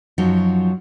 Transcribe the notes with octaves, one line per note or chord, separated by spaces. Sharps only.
F#2 F3 F#3 D#4